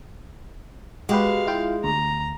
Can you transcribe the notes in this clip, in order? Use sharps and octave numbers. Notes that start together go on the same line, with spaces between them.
G#3 F#4 G4 B4 F5
E4 F4 G5
D2 A#5